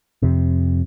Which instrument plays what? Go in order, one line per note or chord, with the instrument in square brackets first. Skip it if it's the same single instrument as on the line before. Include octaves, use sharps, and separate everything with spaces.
[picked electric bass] F2 C3